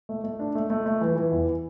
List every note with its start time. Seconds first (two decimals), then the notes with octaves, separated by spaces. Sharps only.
0.09 A3
0.24 A3
0.39 D4
0.55 A3
0.70 A3
0.86 A3
1.01 E3
1.16 E3
1.32 E2